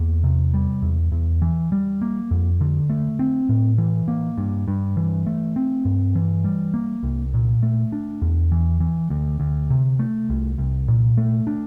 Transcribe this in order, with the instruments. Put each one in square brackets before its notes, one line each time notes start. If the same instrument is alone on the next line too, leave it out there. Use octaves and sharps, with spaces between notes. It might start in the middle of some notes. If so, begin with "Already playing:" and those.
Already playing: [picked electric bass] E2 A#3
C3
G3
E2
E2
E3
G3
A#3
F2
D3
A3
C4
A2
E3
A#3
G2
G2
E3
A3
C4
G2
E3
G3
A#3
C2
A#2
A3
D4
E2
E3
E3
D2
D2
C3
A3
C2
C2
A#2
A3
D4